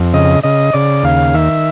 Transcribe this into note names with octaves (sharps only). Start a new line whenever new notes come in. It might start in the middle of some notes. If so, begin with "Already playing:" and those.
Already playing: F2
C#3 D#5
C#3 D#5
C#3 D5
D#2 F5
D#3 E5